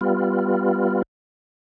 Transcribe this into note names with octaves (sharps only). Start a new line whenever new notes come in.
G3 B3 F4